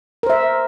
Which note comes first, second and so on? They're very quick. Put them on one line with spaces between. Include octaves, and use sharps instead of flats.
A#4 C5 E5